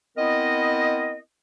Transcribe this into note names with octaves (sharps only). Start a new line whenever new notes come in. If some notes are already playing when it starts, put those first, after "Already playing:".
B3 C4 E4 A#4 D#5